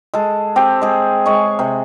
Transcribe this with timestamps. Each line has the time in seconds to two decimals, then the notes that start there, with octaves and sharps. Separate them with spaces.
0.14 G#3 A4
0.56 C4 G4
0.82 G#3 G#4
1.26 G#3 C#5 C#6
1.59 C3